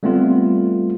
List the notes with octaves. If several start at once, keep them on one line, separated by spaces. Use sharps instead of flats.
G3 A3 B3 C4 F4